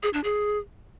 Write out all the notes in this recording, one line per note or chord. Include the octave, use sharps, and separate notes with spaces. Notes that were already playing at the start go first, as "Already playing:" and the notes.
G#4
D4
G#4